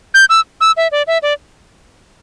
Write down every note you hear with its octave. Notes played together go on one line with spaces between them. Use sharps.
G6
E6
E6
E5
D5
E5
D5